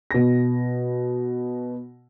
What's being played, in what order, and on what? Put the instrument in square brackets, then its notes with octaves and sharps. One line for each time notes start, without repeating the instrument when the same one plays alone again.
[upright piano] B2 A#6